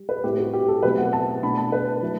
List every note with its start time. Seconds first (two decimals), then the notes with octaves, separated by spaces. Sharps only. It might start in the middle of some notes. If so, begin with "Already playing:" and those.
Already playing: G3
0.09 B4
0.24 A2 G3 C4 E4 G4
0.38 F#4
0.53 G4
0.68 A4
0.83 B2 F#3 A3 C4 E4 B4
0.98 F#5
1.13 A5
1.43 B2 A3 D4 B5
1.58 A5
1.72 B4
2.02 F#3 A3 E4